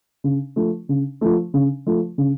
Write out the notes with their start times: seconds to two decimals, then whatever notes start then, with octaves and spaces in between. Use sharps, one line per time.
0.24 C#3
0.56 F3 A3
0.89 C#3
1.21 F3 A3
1.54 C#3
1.86 F3 A3
2.18 C#3